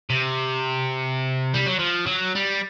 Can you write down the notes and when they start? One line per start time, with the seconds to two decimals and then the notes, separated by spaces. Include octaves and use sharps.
0.10 C3
1.54 G3
1.66 F#3
1.79 F3
2.06 F#3
2.35 G3